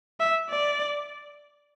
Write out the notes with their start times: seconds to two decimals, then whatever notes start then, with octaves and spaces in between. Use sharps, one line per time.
0.20 E5
0.49 D5